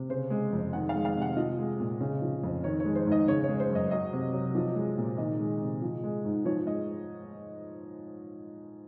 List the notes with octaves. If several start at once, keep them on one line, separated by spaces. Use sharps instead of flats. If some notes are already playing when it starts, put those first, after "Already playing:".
Already playing: C3
C#3 C5
G#3
F2
D#3 F#5
F5
G#3
F5
C3
F#5
F3 D#5
G#3
A#2
C#3
F3
F2
D#3 C#5
C#5
G#3
C5
G#2
D#5
C#3 C#5
C#5
G#3
C5
F#2
D#5
F#3 D#5
C3
F#3
F3
G#3
A#2
D#3 D#5
G#3
C3
F3
G#3
G#2
F3 C#5
G#3 D#5